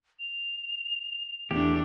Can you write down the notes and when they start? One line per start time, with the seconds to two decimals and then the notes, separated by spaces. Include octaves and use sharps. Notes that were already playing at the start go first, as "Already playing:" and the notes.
0.19 F7
1.51 E2 A3 D4 G4